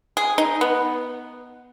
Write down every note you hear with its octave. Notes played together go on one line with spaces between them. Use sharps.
G#4
D#4
B3